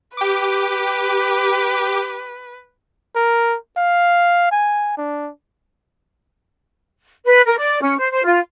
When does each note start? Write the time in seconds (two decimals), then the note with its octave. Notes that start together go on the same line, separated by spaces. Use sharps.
0.17 G4 B4 D6
3.15 A#4
3.77 F5
4.51 G#5
4.97 D4
7.25 B4
7.46 A#4
7.58 D5
7.81 C#4
7.99 C5
8.12 C5
8.24 F4